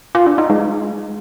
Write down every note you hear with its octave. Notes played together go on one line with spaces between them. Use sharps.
F4
D4
D#4
G#3